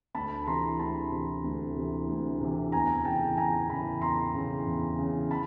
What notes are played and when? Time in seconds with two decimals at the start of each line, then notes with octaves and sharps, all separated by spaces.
0.14 D2 A5 B5
0.47 C3 E3 A#5 C6
0.79 D2 A5 B5
1.11 C3 E3
1.44 D2
1.76 C3 E3
2.09 D2
2.41 C3 E3
2.72 E2 G#5 A#5
3.05 C#3 E3 G5 A5
3.37 E2 G#5 A#5
3.69 C#3 E3 A5 B5
4.01 E2 A#5 C6
4.34 C#3 E3
4.66 E2
4.98 C#3 E3
5.31 A5 B5